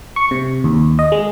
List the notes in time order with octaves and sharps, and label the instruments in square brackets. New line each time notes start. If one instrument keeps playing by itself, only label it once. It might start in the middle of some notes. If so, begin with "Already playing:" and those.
[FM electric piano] C#6
C3
D#2
D#5
G#3